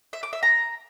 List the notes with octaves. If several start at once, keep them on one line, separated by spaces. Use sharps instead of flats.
E5
D6
E5
A#5